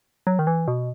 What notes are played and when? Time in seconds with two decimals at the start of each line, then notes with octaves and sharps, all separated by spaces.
0.27 F#3
0.39 D#3
0.47 E3
0.68 B2